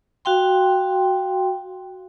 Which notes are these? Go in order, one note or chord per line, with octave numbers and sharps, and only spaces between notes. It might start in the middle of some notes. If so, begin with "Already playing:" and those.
F#4 F5 G5 C6